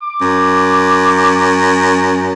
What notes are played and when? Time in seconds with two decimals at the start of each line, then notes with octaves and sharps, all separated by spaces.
0.02 D6
0.21 F#2